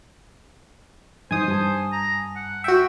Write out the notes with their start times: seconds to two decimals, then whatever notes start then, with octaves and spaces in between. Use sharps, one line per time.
1.31 G2 E3 D#4 C5 G#5 D#6
1.48 G2 A5
1.92 A#5
2.35 F#5
2.64 F#4 E5 G5